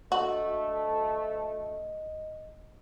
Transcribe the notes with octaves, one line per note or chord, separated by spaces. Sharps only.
D2 A3 F#4 D#5